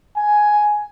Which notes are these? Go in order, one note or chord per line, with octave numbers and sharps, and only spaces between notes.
G#5